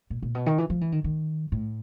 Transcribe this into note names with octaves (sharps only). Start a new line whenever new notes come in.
A#2
A#2
B2
D#3
E3
F3
E3
D#3
D#3
A2